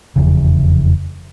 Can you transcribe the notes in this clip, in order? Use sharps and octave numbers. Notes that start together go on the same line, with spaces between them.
F1 E2 C#3